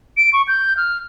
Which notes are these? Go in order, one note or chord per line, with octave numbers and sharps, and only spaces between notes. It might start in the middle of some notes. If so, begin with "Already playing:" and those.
D7
C#6
G6
F6